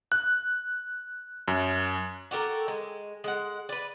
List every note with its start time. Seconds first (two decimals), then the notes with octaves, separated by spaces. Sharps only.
0.12 F#6
1.48 F#2
2.31 F#4 G4 A4 A#4
2.68 G#3
3.24 G#3 F#5
3.69 B4 D5